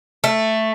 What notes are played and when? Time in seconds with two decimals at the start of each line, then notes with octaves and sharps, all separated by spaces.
0.24 A3